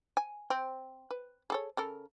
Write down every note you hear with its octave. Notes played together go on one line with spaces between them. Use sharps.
G#5
C4
B4
G#4 A4 C#5
C#3 A4 A#4